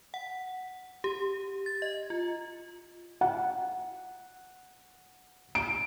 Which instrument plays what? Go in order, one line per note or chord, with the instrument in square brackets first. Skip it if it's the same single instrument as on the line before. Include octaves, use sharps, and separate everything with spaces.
[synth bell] F#5
G4
A6
D#5
F4
[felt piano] F#5
D7